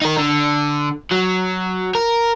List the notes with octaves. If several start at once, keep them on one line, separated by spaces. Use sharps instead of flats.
D#4 A#4
D3
F#3
A#4